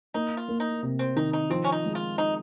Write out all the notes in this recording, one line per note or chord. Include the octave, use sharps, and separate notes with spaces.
A#3 D#4
F4
A#3
D#4
C3
C4
D#3 D#4
D#4
F3 C4
C#4
D#4
G#3
F4
D#4